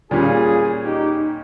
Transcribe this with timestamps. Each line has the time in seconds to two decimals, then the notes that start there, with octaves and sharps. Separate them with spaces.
0.11 A#2 G3 C#4 F4 G#4
0.83 D#4 G4